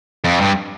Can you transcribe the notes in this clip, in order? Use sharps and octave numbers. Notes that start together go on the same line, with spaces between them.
F2
G2